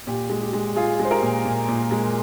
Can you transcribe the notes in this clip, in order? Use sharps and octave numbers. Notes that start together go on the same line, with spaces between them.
A#2 G4
G#3
G4
G#3
G#3 F4 G#4
G#3
C5
G4 A#4
A#2
A#2
A#2
G#3